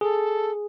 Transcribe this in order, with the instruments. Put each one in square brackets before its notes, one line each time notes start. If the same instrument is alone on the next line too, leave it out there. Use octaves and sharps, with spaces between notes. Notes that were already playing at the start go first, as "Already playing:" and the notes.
[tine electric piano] G#4 [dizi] A4